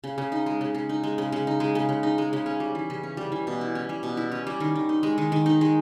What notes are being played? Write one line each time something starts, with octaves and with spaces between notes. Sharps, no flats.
C#3
C#3
D#4
G#3
C#3
C#3
D#4
G#3
C#3
C#3
D#4
G#3
C#3
C#3
D#4
G#3
C#3
C#4
G3
E3
C#3
C#4
G3
E3
B2
E4
C#4
G3
B2
E4
C#4
G3
D#3
D#3
D#4
G#3
D#3
D#3
D#4
G#3